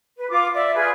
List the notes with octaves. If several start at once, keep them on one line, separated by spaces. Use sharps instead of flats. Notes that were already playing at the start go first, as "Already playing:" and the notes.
B4
F4 D6
D5 E5
F4 G#4 B4